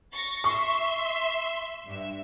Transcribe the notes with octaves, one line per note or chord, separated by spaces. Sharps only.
C#6 A6 A#6
E5 C6 C#6
G2 E5